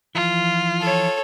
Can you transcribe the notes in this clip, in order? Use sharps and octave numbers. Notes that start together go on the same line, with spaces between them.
E3 F3 F4
A4 C#5